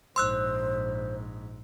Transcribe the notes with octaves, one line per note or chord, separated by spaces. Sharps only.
A#1 G#2 C5 C6 E6 F#6